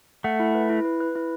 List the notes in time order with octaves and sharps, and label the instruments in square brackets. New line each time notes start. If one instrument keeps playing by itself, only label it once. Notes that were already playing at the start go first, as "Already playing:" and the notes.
[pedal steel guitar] A3 [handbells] F#5
[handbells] E4
B4
E4
B4
B4
E4